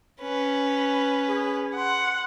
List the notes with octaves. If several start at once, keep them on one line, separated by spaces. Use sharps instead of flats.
C#4 B4
G#4
F#5 C6